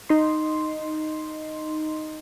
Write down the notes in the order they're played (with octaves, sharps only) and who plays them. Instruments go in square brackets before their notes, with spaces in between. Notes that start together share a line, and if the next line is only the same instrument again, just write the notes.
[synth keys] D#4 C6